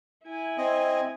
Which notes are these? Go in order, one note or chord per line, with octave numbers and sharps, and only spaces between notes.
E4 G#5
C4 D#5